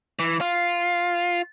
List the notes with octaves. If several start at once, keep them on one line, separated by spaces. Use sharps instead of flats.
E3
F4